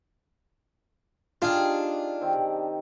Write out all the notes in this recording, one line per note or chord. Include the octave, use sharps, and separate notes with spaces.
D4 D#4 F4 G4 G#4 F5
C3 D#3 C4